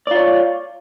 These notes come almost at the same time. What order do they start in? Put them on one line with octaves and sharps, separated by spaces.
D5 F4 C#5